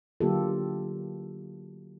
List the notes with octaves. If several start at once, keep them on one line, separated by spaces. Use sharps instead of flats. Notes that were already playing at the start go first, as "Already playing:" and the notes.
D3 F#3 A#3 F4 G4 A4